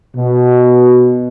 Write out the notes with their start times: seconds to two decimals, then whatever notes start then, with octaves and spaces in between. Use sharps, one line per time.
0.16 B2